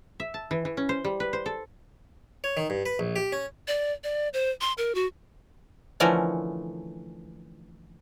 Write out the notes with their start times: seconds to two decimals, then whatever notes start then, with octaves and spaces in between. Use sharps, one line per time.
0.20 E5
0.34 A5
0.51 E3
0.65 E3
0.77 C#4
0.89 C5
1.04 G3
1.20 B4
1.33 C5
1.46 A4
2.44 C#5
2.57 D#3
2.70 G2
2.86 B4
2.99 A#1
3.16 G4
3.32 C#4
3.68 D5
4.04 D5
4.34 C5
4.61 C6
4.78 A#4
4.95 F#4
6.00 D3 E3 F3 A3 C#4 A#4